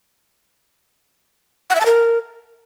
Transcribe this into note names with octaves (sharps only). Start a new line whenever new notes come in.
F#5
E5
A5
A#4